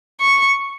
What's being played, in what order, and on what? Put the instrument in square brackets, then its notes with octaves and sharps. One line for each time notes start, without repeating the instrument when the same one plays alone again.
[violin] C#6